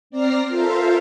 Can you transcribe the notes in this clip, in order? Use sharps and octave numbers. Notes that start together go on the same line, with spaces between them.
C4 D5 A#5 F6 A#6 C7
F4 A4 A#4 C5 E5 F5